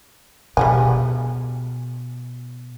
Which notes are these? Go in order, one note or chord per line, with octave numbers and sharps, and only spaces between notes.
B2 G3 G#3 G#5